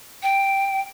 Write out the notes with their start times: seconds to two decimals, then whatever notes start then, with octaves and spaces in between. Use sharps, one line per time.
0.23 G5